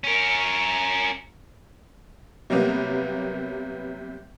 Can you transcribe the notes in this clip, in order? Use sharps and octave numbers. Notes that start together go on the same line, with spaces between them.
C#4 A#4
C3 F#3 G3 A#3 B3